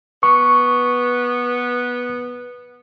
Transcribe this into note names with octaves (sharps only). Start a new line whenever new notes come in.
B3 C#6